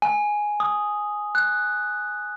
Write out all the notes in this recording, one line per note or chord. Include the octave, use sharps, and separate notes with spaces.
G#5
D#6
F#6